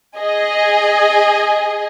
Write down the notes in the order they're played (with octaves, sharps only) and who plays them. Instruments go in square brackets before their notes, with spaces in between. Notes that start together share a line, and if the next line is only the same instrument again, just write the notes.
[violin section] G#4 D#5 G#5